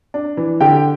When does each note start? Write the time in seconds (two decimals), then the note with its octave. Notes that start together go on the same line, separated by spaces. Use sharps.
0.14 D4
0.37 E3
0.61 D3 G4 G5